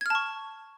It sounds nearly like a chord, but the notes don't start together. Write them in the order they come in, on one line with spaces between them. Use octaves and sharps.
G#6 F6 A5 C#6